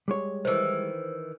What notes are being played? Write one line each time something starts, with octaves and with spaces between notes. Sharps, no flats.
G3 G#3 C#5
D#3 E3 C5